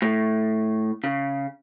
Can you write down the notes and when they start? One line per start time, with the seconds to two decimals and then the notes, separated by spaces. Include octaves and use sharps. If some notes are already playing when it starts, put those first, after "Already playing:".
0.02 A2
1.04 C#3